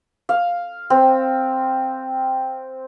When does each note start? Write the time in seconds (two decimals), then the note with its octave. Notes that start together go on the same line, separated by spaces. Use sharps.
0.29 F5
0.90 C4